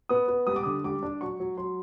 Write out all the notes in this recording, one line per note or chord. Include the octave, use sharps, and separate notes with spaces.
B3 D#6
B3
G3 D#6
D6
D3 D#6
G3 D6
D4
F#3 C#6
F#3
F#3 C6